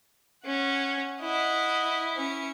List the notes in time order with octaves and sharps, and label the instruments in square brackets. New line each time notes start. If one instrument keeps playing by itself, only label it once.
[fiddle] C#4 [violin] F#5
[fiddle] E4 [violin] D#5 F#5
[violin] C#4 C#7